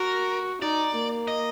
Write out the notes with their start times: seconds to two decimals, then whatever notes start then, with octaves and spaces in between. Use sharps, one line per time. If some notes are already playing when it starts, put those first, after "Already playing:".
Already playing: F#4 A#4
0.61 D#4 D5
0.94 A#3
1.28 D#5